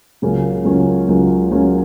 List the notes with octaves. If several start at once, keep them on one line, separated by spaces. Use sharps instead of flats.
C#2 C#3 F#3 A#3 C#4
C#2 C#3 F#3 A#3 C#4
C#2 C#3 F#3 A#3 C#4
C#2 C#3 F#3 A#3 C#4